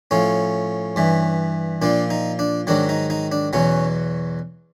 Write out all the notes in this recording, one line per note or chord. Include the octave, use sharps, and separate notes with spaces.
A2 F3 C#4
G2 E3
A#2 F3 D4
D#4
D4
G#2 D#3 F#3 D4
D#4
D#4
D4
E2 B2 F#3 C#4